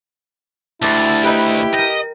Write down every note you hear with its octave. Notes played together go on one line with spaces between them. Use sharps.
D2 E4 G4 C5 E5 A5
D#4 G4 B4 G5
A#4 D#5 G5